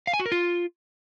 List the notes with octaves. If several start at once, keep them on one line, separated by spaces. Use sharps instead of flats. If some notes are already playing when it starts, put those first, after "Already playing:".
F5
G#5
F#4
A#4
F4